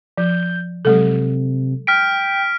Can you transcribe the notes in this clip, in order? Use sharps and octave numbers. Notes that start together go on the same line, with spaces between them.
F3 G6
C3 F#3 G#3 A4
G5 F6 B6 D7